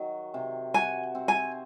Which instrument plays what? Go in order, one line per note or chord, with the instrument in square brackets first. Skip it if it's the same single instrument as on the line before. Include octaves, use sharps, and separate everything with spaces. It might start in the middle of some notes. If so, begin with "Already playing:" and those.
Already playing: [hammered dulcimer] D#3 F#3
C3
[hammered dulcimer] F#4 [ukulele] G#5
[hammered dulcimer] C4
[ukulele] G#5